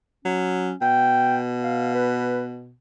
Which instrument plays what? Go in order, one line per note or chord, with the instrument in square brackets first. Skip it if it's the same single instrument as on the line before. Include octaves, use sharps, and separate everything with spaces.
[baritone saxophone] F#3 [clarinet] C#4
[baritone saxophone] B2 [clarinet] G5
[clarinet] F5
B4